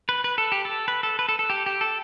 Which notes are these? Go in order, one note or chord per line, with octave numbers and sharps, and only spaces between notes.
B4
B4
A4
G4
A4
B4
A4
B4
A4
A4
G4
G4
A4